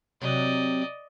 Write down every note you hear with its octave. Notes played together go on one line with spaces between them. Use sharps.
C3 F#3 D5 D#5